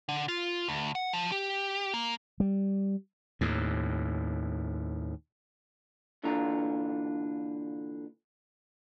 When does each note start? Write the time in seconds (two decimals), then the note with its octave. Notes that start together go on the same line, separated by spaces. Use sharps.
0.09 D3
0.28 F4
0.68 D2
0.95 F#5
1.13 F3
1.32 G4
1.94 A#3
2.40 G3
3.41 D#2 A2
6.24 A#2 D3 E3 D4 F4 A#5